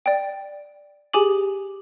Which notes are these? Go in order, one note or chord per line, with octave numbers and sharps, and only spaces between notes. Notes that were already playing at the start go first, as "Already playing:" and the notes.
D5 G5
G4 G#4 G#5 D6 F#7